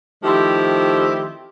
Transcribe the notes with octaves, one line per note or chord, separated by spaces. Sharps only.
D#3 F3 A3 C4 E4 G4